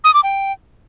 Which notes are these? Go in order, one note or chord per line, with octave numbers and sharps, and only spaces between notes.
D#6
D6
G5